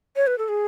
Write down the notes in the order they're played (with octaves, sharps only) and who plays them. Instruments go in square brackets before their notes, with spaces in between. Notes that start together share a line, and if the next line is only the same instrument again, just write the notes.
[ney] C#5
B4
A4
G#4